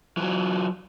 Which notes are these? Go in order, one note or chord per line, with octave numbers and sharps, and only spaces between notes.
E3 F#3